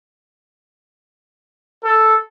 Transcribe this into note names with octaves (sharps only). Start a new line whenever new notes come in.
A4